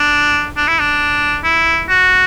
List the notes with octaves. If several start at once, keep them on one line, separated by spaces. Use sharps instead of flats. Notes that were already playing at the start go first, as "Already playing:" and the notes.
Already playing: D4
D4
E4
D4
E4
F#4